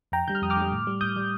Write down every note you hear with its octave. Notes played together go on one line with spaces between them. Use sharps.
F2 G5 A#5
D3 G3 G6
F6
F2 D#6
D6 F6
D3 G3
A2
G3
A2 D#6 G6
G3